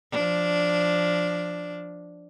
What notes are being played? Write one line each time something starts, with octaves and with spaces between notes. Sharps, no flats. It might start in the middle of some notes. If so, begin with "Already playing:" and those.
F3 D4